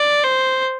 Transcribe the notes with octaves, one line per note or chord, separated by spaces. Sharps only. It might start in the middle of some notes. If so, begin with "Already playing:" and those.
Already playing: D5
C5